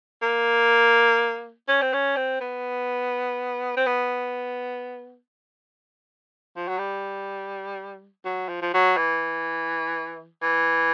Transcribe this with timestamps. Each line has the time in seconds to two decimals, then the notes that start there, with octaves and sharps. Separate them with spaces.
0.22 A#3
1.68 C#4
1.82 C4
1.93 C#4
2.16 C4
2.41 B3
3.77 C4
3.87 B3
6.56 F3
6.68 F#3
6.78 G3
8.25 F#3
8.49 F3
8.62 F3
8.74 F#3
8.97 E3
10.43 E3